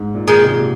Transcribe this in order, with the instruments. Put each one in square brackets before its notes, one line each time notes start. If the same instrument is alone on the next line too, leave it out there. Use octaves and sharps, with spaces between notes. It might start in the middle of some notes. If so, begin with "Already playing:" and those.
Already playing: [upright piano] G#2
A#2
[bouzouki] D#3 G#3
[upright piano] C3
A#2
C3